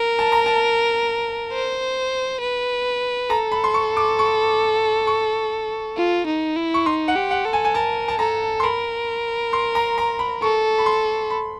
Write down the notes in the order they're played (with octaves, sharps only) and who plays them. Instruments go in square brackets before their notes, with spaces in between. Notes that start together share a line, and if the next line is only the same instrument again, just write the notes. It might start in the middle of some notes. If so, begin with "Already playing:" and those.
Already playing: [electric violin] A#4
[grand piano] A5
A#5
A5
[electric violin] C5
B4
[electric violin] A4 [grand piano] A#5
[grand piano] B5
C6
C#6
D6
C#6
C#6
[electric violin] F4
D#4
E4
[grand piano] C#6
[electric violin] D#4 [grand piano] C6
[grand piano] F#5
[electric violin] G4
[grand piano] F#5
[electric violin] A4
[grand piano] G#5
G#5
[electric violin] A#4 [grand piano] A5
[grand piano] A5
[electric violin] A4 [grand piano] A#5
[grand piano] C6
[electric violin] A#4 [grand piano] B5
[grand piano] C6
A#5
A#5
B5
[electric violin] A4 [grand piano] C#6
[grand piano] B5
C6
B5